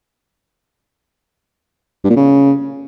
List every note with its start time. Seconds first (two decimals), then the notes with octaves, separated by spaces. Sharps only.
2.04 G2
2.10 A#2
2.16 C#3